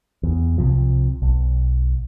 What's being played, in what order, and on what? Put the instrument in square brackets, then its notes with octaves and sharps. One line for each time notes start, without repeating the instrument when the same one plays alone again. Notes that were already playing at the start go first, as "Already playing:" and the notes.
[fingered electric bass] E2
C2 C3 F3
B1